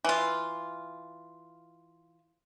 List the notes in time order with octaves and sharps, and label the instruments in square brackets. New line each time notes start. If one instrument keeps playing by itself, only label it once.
[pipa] E3 F4